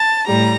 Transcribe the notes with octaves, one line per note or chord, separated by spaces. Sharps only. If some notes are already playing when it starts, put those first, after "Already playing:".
Already playing: A5
A2 G3 A#5